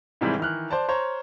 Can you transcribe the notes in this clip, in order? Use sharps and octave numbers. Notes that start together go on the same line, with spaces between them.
G#2 C3 D#3 E3 G3 G#3
D#3 E3 F6 F#6
C5 D5 A5
C5 C#5 A#5